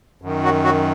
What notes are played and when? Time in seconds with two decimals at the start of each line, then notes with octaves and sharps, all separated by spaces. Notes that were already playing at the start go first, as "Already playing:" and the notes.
0.22 F#2 D#3
0.43 F#3 F#4
0.64 F#3 F#4